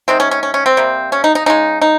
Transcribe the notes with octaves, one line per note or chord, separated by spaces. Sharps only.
C3 D#3 G#3 C4
C#4
C#4
C#4
C#4
C4
C3 G3 A#3
C#4
D#4
D#4
C#3 G#3 D#4
D#4